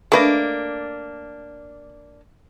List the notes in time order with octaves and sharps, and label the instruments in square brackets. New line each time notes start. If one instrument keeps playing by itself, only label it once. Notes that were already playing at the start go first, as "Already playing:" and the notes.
[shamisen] A3 B4 D#5 [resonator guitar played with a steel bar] A#3 D4